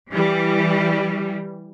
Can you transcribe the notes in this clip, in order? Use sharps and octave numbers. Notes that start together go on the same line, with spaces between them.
E3 G3